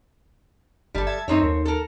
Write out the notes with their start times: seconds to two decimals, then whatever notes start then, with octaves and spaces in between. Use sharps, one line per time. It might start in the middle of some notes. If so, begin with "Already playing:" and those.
0.95 G1 G3 A4 A5
1.07 E5 A5 G#6
1.28 F#2 A3 C4 D#4 C#5
1.42 D#2
1.65 A4 A#4